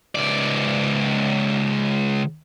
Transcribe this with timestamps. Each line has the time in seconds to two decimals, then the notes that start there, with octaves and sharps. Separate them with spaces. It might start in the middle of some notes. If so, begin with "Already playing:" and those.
0.15 C#2 D5